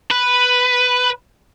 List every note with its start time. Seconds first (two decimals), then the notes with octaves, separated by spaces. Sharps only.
0.11 B4